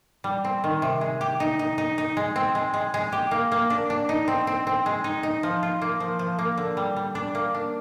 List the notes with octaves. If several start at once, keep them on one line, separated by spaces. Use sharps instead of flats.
G3
C4
D#3
C3
G#3
G4
D#4
D#4
D#4
D#4
G#3
C4
G#3
G#3
G#3
G4
A#3
A#3
D4
D4
D#4
C4
C4
C4
G#3
D#4
D#4
F3
F4
A#3
F3
F3
A#3
D3
G3
G3
D4
A#3
D4